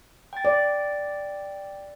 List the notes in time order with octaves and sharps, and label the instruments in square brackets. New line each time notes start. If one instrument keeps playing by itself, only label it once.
[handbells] G5 A6
[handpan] D5